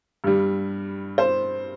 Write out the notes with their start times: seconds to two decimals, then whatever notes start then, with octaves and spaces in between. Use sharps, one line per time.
0.24 G2 G3
1.18 C5